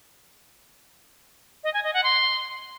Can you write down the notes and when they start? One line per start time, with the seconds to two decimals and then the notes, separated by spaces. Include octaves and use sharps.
1.64 D#5
1.74 G#5
1.84 D#5
1.94 F#5
2.04 C6